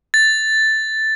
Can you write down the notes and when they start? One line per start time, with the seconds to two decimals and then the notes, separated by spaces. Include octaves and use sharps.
0.14 A6